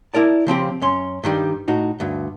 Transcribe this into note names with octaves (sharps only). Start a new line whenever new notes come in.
E4 A#4 D5 A5
C#3 F3 C4 G4
F#2 C#4 C6
G2 D#3 G3
A2 D#4 F#4
D2 G2